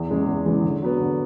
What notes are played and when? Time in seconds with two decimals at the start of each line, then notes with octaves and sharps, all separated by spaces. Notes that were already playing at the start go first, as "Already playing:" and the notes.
Already playing: E2
0.09 C#3 E3 G#3
0.27 E2
0.45 C#3 E3 G#3
0.63 D3
0.81 F#3 B3
1.00 D3